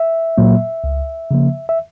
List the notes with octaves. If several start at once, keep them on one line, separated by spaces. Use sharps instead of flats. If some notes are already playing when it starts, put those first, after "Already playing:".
Already playing: E5
A#2 F#3 A#3
C#2
C#3 F3 A#3
E5